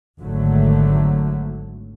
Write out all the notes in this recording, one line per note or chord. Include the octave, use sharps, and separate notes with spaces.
G#1 D3 F#3 A3